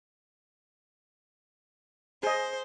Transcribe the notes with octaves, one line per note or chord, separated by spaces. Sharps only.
G#4 C5 D#5